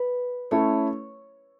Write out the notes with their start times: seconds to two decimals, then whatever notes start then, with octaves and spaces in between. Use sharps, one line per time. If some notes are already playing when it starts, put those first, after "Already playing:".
Already playing: B4
0.51 A3 C#4 E4 A4 C#5